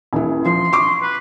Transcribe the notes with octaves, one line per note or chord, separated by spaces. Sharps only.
D#1 E3
F3 C6
C#6 D6
B4